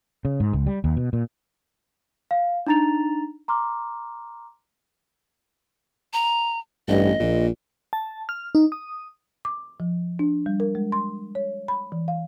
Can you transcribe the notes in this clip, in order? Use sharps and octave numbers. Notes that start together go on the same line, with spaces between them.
C#3
G#2
C#2
G3
D#2
B2
A#2
F5
D4 D#4 A#5 A6 F7
A#5 C6 D6 F6
A#5
A1 G2 D#5
A#1 A#2
A5
F6
D#4
D#6
D6
F3
D4
G3
A#4
G#3
C6
C#5
B5
E3
F5